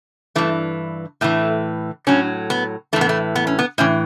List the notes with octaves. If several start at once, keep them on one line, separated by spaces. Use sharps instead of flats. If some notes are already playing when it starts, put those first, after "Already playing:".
G2 E3 A3
A2 E3 A3
A2 F#3 C#4
B3
A2 E3 A3
B3
A3
B3
C#4
B3
A2 E3 C#4